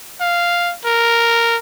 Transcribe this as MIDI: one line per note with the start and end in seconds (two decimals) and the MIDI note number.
0.21 0.74 77
0.85 1.57 70